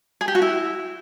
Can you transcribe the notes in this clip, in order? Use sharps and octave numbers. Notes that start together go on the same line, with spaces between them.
G#4
G4
F#4
E4